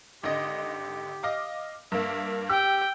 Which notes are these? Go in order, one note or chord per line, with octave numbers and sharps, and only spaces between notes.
G#1 D3 G4 D#5
D#5 F5 D6
G2 A#3 E5
G4 G5 E6